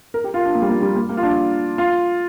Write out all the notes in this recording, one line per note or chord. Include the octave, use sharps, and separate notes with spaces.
A#4
G4
F4
D4
A#3
G3
A#3
G3
A#3
A#3
F4
D4
F4